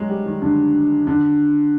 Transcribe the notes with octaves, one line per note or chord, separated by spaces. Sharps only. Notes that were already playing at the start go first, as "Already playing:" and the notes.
Already playing: F#3 G#3
G3
D#3
D3
D3